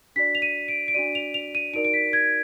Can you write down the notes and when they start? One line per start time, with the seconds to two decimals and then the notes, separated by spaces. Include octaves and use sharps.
0.16 D4 F#4 D5 B6
0.35 F7
0.42 D#7
0.68 D7
0.88 D7
0.94 D4 F#4 D5 D#7
1.15 F7
1.34 F7
1.55 D#7
1.73 D#4 F#4 A#4 D5 D7
1.85 D7
1.94 B6
2.13 G#6